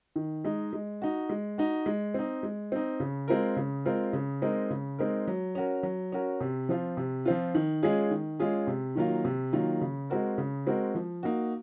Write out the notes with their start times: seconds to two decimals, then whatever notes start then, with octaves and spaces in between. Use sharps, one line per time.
0.16 D#3
0.45 G#3 D#4
0.73 G#3
1.02 D#4 F#4
1.29 G#3
1.58 D#4 F#4
1.86 G#3
2.14 C4 D#4
2.43 G#3
2.72 C4 D#4
3.00 C#3
3.28 G#3 C4 F4 A#4
3.56 C#3
3.85 G#3 C4 F4 A#4
4.13 C#3
4.42 G#3 C4 D#4 A#4
4.70 C#3
4.99 G#3 C4 D#4 A#4
5.27 F#3
5.55 C#4 F#4 A#4
5.83 F#3
6.12 C#4 F#4 A#4
6.41 C3
6.69 F3 C4 F4
6.97 C3
7.26 F3 C4 F4
7.55 D#3
7.83 G#3 C#4 F4 G#4
8.11 D#3
8.39 G#3 C#4 F4 G#4
8.67 C3
8.95 D#3 F#3 A#3 F4
9.25 C3
9.53 D#3 F#3 A#3 F4
9.81 C#3
10.10 G#3 C4 F#4 A#4
10.38 C#3
10.67 G#3 C4 F#4 A#4
10.95 F3
11.23 A#3 D#4 F#4